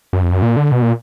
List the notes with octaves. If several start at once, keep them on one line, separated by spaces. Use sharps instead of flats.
F#2
F2
F#2
A#2
D3
B2
A#2